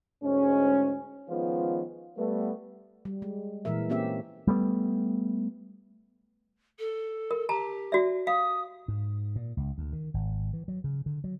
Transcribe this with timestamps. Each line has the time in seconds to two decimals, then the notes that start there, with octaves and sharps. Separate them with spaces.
0.24 D2 G#2 G#3 C#4
1.29 D#3 F3 G#3 B3 C#4 F4
2.17 G3 A3 B3
3.05 G3
3.22 G#3
3.65 A#2 E3 G#3 A#4 E5
3.90 A#3 C4 C#4 G4 E5
4.47 G3 A3 B3
6.79 A4
7.31 A#4
7.49 G4 A5 A#5
7.92 F#4 D5 E5
8.27 F5 D#6
8.88 G#2
9.36 A#2
9.57 C#2
9.78 D2
9.93 D#3
10.14 G#1
10.53 E3
10.68 F#3
10.84 C#3
11.06 D3
11.24 F#3